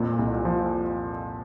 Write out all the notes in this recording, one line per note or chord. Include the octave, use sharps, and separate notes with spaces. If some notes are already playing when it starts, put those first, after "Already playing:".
Already playing: F2 A#2 A#3
C2
F3